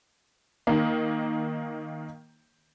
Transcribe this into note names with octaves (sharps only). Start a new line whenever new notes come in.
D#3 A#3